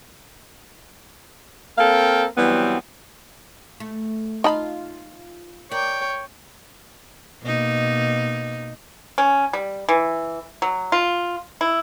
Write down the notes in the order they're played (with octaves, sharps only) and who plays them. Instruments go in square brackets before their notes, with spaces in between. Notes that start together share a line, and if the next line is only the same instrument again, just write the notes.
[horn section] A#3 C4 A4 F5 G5
E3 F#3 G3 B3 C4
[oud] A3
[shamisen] D#4 A5 B5 [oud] F4 F5
[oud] A#4 D5 [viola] C#5 G5
[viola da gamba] B2 A#3 D#4
[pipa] C#4
G3
E3
F#3
F4
E4